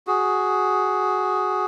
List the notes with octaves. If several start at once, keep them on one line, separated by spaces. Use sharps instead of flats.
F#4 G#4